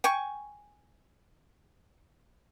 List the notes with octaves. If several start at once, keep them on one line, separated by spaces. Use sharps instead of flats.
G5 G#5 C#6